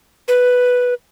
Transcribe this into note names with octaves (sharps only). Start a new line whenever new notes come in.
B4